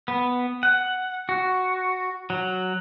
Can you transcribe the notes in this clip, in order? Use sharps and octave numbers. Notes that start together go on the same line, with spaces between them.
B3
F#5
F#4
F#3